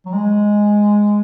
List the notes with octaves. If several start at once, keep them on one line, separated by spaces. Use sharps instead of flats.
F#3
G#3